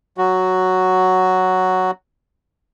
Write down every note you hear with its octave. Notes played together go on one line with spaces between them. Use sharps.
F#3 F#4